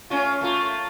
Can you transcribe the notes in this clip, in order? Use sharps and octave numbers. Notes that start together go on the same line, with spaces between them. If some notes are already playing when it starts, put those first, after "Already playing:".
A3 C#4 F4
A3 A#3 F4